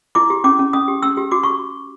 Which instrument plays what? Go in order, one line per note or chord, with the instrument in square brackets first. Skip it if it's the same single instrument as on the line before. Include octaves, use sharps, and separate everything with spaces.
[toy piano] E4 D6
G4
C#4 D6
C#4
C#4 D#6
G4
C#4 E6
G4
F#4 D6
C#6